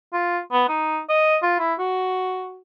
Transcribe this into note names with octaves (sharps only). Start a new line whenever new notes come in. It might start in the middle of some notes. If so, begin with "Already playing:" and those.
F4
B3
D#4
D#5
F4
E4
F#4